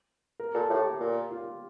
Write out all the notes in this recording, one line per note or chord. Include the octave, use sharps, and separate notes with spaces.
A#4
A#2 A4
A2 G4
A#2
F4